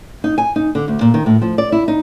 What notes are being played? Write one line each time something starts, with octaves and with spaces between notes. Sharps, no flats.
D#4
G#5
D#4
D3
D2
A#2
D#3
A2
F3
D5
E4
D#4